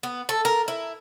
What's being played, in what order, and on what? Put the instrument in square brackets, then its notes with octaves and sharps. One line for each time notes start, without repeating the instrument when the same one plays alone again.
[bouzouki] B3
A4
A#4
E4